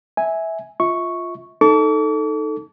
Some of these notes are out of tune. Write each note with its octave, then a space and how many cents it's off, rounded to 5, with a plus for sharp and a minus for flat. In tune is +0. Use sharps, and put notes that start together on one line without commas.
E5 -15 G#5 +0
F4 +0 E5 -35 C#6 +0
D#4 +0 A4 +0 D6 -45